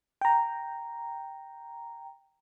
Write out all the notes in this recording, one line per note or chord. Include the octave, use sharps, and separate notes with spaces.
G5 A#5